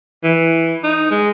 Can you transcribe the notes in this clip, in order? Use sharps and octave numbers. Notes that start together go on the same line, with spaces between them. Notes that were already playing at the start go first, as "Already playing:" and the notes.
E3
D#4
G#3